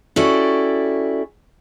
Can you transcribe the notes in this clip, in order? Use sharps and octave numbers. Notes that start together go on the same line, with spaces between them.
C#4 E4 F#4 G4 A4 D5